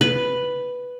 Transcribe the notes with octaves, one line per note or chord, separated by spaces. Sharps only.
B4